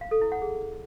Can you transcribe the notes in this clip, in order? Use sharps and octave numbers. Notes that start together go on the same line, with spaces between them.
F5
A4
E4
F#5
G#4